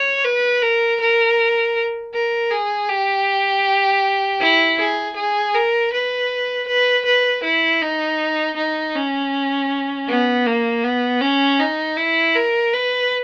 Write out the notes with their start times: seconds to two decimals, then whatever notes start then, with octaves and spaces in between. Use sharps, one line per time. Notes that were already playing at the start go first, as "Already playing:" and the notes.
Already playing: C#5
0.24 B4
0.62 A#4
1.00 A#4
2.14 A#4
2.51 G#4
2.89 G4
4.40 E4
4.79 G#4
5.16 G#4
5.54 A#4
5.92 B4
6.67 B4
7.05 B4
7.43 E4
7.81 D#4
8.56 D#4
8.95 C#4
10.08 B3
10.46 A#3
10.84 B3
11.21 C#4
11.59 D#4
11.97 E4
12.35 A#4
12.73 B4